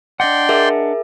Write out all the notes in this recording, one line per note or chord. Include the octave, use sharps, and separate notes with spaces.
D4 D5 D#5 F#5 G5 C6
G#4 A#4 E5